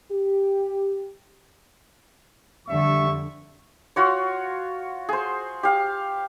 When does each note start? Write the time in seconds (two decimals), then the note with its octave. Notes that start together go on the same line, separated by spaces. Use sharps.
0.11 G4
2.68 F2 D3 G3 E5 C#6
3.96 F4 F#4 C#5
5.09 G#4 C5
5.63 G4 F5